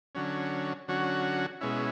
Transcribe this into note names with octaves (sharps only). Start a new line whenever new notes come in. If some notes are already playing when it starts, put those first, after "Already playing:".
D3 F#3 C#4
D3 F#3 C#4 F#4
B2 G#3 C#4 E4